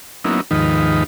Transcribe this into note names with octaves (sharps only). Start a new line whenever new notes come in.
F#3 A#3 B3 C#4 D#4 E4
D#2 G#2 D#3 F3 D#4 B4